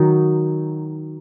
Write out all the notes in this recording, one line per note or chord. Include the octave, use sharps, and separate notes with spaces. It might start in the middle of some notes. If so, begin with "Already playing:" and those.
Already playing: D#3 F#3 D#4